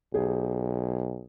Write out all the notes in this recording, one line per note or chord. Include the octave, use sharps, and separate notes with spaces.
B1 G4 G#4